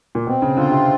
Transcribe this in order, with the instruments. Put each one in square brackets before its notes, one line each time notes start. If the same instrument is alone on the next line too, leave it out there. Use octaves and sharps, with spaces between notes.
[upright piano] A#2
[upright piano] B2 [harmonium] C4
[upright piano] C#3
[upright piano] D3 [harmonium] F4
[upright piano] C3